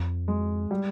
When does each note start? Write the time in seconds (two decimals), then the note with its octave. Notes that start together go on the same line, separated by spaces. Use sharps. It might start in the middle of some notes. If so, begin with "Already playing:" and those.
Already playing: F2
0.28 G#3
0.71 G3